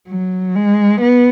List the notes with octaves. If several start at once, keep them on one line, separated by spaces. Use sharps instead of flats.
F#3
G#3
B3